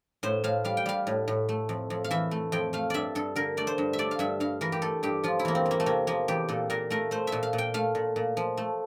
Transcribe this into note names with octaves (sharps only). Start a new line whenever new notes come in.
A2 C5
A2 F5
G3 F5
G5
G3 F5
A2
A2
A3
F2
F2
F5
E3 E5
A3
F2 G5
A3 F5
G2 D5 E5
G2 A4
D3 A#4
A3 D5
C5
G2
E5
A3 D5
F5
G2 E5
G2 F5
E3 A#4
G4
A3 A4
G2 G4
F3 F4
E4
E2 A#3
C4
E2
A#3
A3
C3 A#3
F3 A#3
E2 G4
A#2 A4
A#2 A#4
A3 A#4
A3 C5
A#2 E5
F5
A#2
G5
A3 F5
A#2
A#2
F3
A3